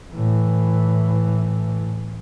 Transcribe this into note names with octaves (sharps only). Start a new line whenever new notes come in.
A2 E3